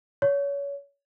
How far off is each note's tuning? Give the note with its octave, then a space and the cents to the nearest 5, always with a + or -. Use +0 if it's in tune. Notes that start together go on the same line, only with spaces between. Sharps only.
C#5 +25